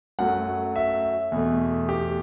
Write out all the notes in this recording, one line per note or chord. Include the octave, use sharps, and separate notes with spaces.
F#2 F#3 A3 F#5
E5
E2 B2 A3
G4